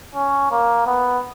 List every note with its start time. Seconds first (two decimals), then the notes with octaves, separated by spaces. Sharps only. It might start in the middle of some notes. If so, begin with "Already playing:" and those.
0.15 C#4
0.51 A#3
0.86 B3